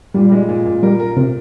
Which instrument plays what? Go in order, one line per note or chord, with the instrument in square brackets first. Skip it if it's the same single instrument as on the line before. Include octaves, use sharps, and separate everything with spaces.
[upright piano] A#2 [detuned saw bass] G3
[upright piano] G#3
A#2
A#2
[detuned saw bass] G3 [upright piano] A#4
[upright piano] A#4
[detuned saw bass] C3 [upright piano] A#4